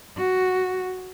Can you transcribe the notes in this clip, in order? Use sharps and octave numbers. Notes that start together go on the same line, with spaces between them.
F#4